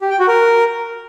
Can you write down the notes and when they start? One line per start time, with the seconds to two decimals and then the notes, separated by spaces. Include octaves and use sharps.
0.01 G4
0.10 G5
0.19 F#4
0.28 A#4